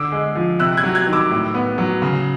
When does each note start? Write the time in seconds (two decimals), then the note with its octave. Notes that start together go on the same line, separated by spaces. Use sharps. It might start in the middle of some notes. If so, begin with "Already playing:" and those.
Already playing: D3 D6 E6
0.12 G#3
0.35 F3
0.59 C3 E6 F#6
0.77 F#6 G#6
0.83 F#3
0.95 F#6 G#6
1.07 D#3
1.13 D6 E6
1.31 A2
1.54 B3
1.78 F#3
2.02 C#3